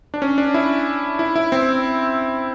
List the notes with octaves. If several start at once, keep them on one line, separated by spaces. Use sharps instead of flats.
D4
C#4
D4
E4
E4
E4
C4